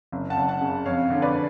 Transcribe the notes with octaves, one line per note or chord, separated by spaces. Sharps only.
F#1
F#5 A5
F#1
F#5 A5
C#3
F2 C#5 F5
D3
B4 D5